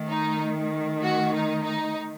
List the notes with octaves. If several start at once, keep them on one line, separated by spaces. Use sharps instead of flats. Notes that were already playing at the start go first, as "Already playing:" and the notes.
Already playing: D#3 A3
D#4
F#4
D#4
D#4